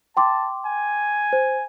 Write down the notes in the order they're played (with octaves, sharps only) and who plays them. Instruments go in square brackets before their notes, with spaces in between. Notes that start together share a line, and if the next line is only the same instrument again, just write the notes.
[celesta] G5 C6 D6 [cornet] A5
[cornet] G#5
[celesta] C5